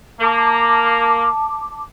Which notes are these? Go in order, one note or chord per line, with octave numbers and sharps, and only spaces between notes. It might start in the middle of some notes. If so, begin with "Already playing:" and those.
A#3 A5 D6